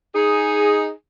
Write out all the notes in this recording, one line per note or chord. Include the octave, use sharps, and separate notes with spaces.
D#4 G#4